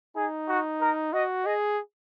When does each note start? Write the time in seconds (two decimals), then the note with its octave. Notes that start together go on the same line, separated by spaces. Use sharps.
0.16 D#4 G#4
0.49 F#4
0.81 A#4
1.13 F#4 D#5
1.45 G#4 D#5